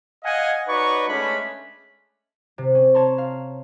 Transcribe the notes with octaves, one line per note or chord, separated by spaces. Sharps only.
D#5 F5 F#5 G#5
D#4 F#4 B4 C#5 D5 C#6
G#3 A3 C#4 D4 B5
C3
C#4
C#5 A5 A#5 C6
F5